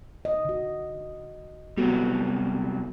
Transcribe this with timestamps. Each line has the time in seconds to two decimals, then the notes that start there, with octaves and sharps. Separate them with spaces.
0.25 D#5
0.45 D3 F#4
1.77 C3 F#3 G3 B3 F#4 A4